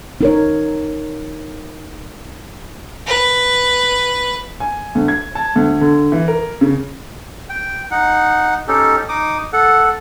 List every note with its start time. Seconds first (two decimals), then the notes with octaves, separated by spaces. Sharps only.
0.21 D#4 A#4 C#5
3.07 B4
4.60 G#5
4.95 D2
5.08 G#6
5.35 A5
5.56 D2
5.81 D3
6.12 E3
6.28 A#4
6.61 C#3
7.49 G5
7.91 D#4 F#5
8.68 C#4 D#4 G4 A4
9.09 D#4 D6 D#6
9.53 A4 F#5